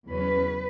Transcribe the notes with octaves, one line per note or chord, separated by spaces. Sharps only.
E2 C#3 F#3 C#4 B4